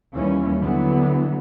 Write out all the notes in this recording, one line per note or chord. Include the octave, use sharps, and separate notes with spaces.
D#2 E3 G3 C#4
D3 E3 F#3 B3